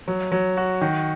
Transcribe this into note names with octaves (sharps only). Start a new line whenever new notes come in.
F#3
F#3
F#4
D#3